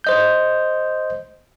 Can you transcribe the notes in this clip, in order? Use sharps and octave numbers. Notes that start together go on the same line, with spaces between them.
C5 D#5 G6